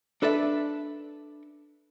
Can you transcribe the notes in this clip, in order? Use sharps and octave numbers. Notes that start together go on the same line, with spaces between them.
D4 A4 B4 D5 E5